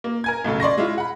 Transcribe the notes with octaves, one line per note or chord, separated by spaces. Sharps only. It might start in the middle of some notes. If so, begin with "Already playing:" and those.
A#3
A#4 G#5 G#6
B1 A2 C#3 A4
D5 C6 C#6 A#6
G#3 E4 F4
F#5 B5